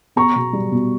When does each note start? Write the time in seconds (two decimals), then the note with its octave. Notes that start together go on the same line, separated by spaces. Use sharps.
0.16 B3 A#5 C#6
0.36 B2
0.53 G3
0.72 B2